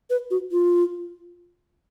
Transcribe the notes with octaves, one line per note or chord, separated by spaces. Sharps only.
B4
F#4
F4